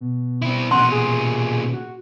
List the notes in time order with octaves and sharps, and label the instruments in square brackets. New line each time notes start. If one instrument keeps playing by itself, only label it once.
[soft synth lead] B2
[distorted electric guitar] C4 E4
[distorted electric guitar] A#2 C#4 [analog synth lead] F#5 [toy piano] C6
[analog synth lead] G#4
[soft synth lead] F#4